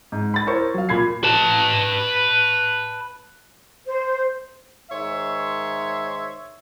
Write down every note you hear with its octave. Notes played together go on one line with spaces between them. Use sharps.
G#2
B5 A6
E4 A#4 C5 C#5 C#6
F#3 F5
A#2 B5 G#6 C7
B4 A5
C5
G#2 D#3 C#5 E5 C6